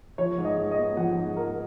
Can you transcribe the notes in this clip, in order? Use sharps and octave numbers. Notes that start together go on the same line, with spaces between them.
F3 C#5
G#2
D#5
G#2
D#5
B3
F3 F#5
G#2
G#2 A#4